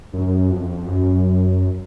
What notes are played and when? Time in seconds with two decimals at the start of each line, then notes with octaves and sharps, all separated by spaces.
0.13 F#2
0.51 F2
0.87 F#2